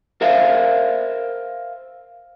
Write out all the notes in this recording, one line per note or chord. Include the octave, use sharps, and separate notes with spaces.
A#4 C5 E5 F5